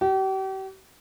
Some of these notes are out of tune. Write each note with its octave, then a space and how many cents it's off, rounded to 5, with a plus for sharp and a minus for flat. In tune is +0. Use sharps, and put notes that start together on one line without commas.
G4 -40